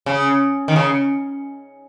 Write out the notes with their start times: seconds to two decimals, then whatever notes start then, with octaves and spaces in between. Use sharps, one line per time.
0.06 C#3
0.68 D#3
0.76 C#3